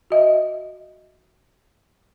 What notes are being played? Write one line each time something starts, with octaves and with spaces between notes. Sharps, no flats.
F#4 D#5 E5